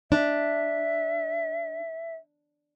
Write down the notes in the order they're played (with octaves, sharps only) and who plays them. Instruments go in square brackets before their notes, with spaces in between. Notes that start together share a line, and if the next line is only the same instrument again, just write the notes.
[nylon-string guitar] D4 [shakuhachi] E5